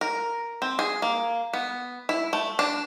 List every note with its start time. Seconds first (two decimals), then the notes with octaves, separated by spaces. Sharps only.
0.01 A#4
0.62 C4
0.79 G#4
1.02 A#3
1.53 B3
2.09 E4
2.33 A3
2.59 D4